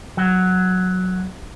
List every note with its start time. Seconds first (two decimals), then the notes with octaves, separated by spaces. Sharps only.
0.17 F#3